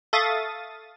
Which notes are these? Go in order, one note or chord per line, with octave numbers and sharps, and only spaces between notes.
A4 E5 F5 C#6 D#6 A6